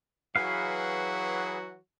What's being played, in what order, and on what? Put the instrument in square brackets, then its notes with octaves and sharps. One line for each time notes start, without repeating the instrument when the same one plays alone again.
[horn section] E3 F#3 F#4 [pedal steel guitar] G#4 B4 F5